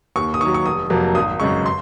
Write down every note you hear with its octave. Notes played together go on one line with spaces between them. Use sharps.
D#2 C#6
D#6
D#3 F#3 C#6
C#6
F1 D#6
F2 C3 F#3 A#3
G#1 D#6
F#2 C#3 G#3 C#6
C6